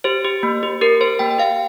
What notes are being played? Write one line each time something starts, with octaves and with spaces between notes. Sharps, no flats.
G4 C5
G4
A#3
G4
G4 A#4
G4 C5
A#3 G5
G5
G4 F5